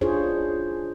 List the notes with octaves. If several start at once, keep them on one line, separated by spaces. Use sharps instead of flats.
D4 E4 F4 G#4 C5 C#5